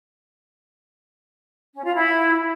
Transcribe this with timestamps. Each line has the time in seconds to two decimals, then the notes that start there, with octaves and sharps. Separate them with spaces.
1.74 C#4
1.85 F4
1.95 E4